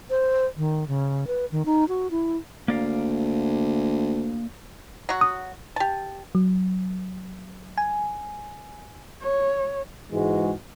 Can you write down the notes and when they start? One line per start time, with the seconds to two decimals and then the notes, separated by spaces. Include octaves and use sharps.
0.10 C5
0.57 D#3
0.88 C#3
1.27 B4
1.52 D#3
1.66 D#4
1.88 F#4
2.11 E4
2.68 D2 A#3 D5 F5
5.09 F#3 F#4
5.21 D#6
5.76 G4 A5
6.35 F#3
7.78 G#5
9.21 C#5
10.11 G#2 E3 G#3 F#4